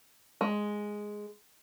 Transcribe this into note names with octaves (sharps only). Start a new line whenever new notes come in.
G#3